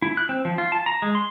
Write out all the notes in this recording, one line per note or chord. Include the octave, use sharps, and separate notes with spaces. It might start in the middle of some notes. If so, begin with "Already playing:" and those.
E4
F#6
C4
F3
F4
A5
A#5
G#3
C6